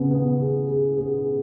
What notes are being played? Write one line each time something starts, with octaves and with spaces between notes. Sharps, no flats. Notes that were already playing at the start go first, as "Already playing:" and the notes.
Already playing: C#3 B3
B3
G#4
G#4
G#4